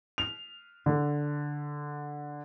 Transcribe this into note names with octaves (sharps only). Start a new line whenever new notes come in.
F7
D3